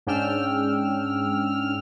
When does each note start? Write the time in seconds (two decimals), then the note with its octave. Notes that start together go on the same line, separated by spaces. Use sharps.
0.07 G#2 C#4 D4 G5 E6 F6